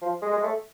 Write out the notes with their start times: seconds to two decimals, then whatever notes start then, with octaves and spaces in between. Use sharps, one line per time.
0.02 F3
0.22 G#3
0.33 G#3
0.43 A3